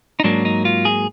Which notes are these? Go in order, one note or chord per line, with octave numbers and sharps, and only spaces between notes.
D#4
G#2 F#3 A#3 D4
D#4
F4
G#4